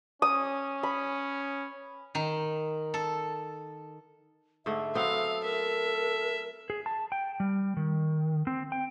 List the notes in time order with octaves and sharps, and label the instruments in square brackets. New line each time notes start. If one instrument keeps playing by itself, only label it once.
[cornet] C#4 [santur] D#6
[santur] B5
[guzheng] D#3
A4
[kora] G#2 D3 A3 [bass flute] E5
[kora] F#3 B3 C4 [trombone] A4 [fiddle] F5
[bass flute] A#4 [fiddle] E5
[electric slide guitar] G#4
A5
G5
G3
D#3
C4
G5